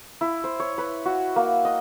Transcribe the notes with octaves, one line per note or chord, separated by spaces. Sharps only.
E4
C5
C#5
B4
F#4
A#3
D#5